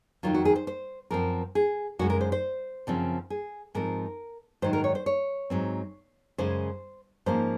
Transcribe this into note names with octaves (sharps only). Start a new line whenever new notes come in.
F2 D#3 F#3 F4
F#4
G#4
C5
C5
F#2 F3 C4 A#4
G#4
F#2 C#3 G#3 F#4
A#4
C5
C5
F#2 C#3 F3 C4
G#4
G#2 F3 C4 A#4
G#2 D#3 F#3 C5
A#4
C#5
C5
C#5
G#2 F#3 C4
F#2 C#3 G#3 C5
G#2 F3 A#3 C#4 C5